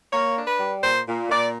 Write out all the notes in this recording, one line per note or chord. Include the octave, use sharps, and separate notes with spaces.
A#3 C#5
D4
B4
G3
A#2 C5
A#2
A#2 D5